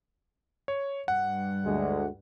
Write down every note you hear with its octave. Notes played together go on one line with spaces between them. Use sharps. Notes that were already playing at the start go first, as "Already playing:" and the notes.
C#5
G2 G3 F#5
D2 G#3